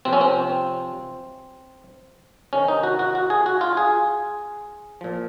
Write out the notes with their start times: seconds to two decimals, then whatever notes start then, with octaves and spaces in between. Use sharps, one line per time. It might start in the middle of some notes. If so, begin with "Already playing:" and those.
0.05 C3 F3 C4
0.13 C#4
0.21 C4
2.53 C3 D#3 C#4
2.68 D#4
2.83 F#4
2.99 F#4
3.15 F#4
3.30 G#4
3.46 F#4
3.61 F4
3.77 G#4
5.01 A#2 F3